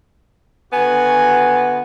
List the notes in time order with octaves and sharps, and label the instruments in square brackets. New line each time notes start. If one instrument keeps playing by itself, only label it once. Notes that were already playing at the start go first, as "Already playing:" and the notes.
[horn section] D3 B3 F#4 [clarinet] G#5